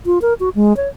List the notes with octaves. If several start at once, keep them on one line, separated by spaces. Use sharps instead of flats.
F4
A#4
F#4
G#3
C#5